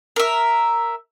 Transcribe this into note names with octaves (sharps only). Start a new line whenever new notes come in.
A#4 E5